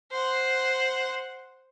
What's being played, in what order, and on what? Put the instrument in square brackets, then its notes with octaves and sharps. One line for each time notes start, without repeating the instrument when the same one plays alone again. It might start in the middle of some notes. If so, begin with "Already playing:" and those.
[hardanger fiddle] C5 F#5